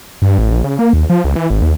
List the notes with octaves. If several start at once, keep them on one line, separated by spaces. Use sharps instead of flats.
G2
A1
A#1
C#3
A#3
D#2
F3
C#2
E3
G#1
D#2